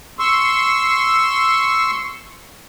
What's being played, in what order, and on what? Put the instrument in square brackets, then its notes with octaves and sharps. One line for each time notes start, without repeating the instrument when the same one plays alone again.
[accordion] C6 C#6 E6